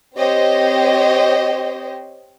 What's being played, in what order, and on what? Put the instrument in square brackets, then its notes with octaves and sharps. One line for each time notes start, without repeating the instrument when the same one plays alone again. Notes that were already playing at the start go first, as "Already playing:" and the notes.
[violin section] C4 G4 C5 C#5 D#5